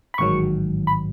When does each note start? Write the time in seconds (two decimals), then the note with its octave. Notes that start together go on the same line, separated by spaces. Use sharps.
0.14 B5
0.18 A1 G#2 D#3 F#3 C#6
0.87 B5